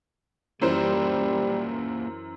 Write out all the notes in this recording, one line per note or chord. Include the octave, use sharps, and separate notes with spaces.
F#2 E3 G3 A#3 F4 G4 C5